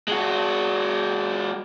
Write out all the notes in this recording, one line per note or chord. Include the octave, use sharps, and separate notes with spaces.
G#3 F#4